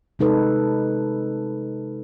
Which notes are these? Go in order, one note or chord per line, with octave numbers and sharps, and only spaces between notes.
C3 G#3 D#4 A4 B4